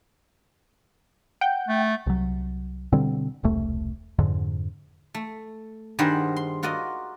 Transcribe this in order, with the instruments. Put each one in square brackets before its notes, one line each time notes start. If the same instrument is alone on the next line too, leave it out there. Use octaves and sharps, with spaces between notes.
[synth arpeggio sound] F#5 G5 G6
[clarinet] A3
[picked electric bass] C2 F#3
B2 D3 G3 C4
E1 C2 A3
F2 G#2 D3
[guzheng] A3
G2 D#3 G3 G#4 C5 F#5
C6
F4 F#4 A#4 D5 D#5